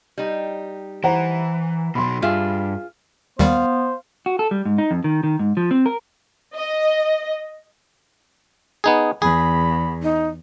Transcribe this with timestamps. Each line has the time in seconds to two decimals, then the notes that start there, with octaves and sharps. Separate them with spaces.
0.18 G3 D#4
1.04 E3 C5 F#5 A#5
1.95 B2 F#3 B5 C6
2.22 G2 F4 G#4 E5
3.39 D#2 D#3 G3 B3 C5 F5
4.26 F#4
4.39 A4
4.51 G3
4.66 G#2
4.78 D#4
4.91 F2
5.04 D#3
5.23 D#3
5.39 G#2
5.57 F3
5.71 C4
5.86 A#4
6.55 D#5
8.84 B3 D#4 G#4
9.22 E2 G#4 B5
10.03 D#4